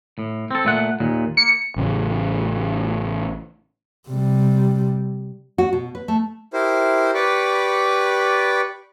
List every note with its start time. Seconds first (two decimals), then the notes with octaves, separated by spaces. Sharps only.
0.19 A2
0.51 C4 A4
0.65 A#2 A3 F#5
1.00 D#2 A#2
1.37 A#3 C#7
1.76 A1 C#3
4.09 C3 G3
5.58 F#4
5.73 B2
5.95 B4
6.08 A3
6.53 E4 G4 A#4 C5
7.14 G4 B4 D5 B5 C#6 D6